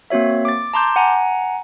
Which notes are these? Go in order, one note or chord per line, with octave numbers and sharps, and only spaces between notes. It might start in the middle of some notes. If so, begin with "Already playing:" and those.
A#3 C4 F#4 C#5 E5
D6 A6
A5 A#5 C6 D6 G6
F#5 G#5 A#5